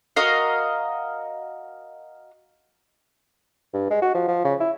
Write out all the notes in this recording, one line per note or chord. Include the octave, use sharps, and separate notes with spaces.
F#4 A#4 D#5 F5
G2
G#3
F#4
F3
F3
C#3
E4